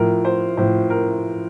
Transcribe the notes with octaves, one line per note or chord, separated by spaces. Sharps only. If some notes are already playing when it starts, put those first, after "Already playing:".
Already playing: A2 F3 A#4
C5
A2 F3 C5
A#4